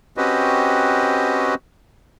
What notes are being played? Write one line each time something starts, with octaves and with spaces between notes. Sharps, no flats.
C4 C#4 F#4 G4 B4 D#5